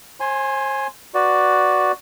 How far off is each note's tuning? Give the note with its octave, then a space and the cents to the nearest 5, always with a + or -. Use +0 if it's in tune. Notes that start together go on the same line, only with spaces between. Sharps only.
C5 +40 G#5 +0 C6 +0
F#4 +0 B4 +0 D5 +0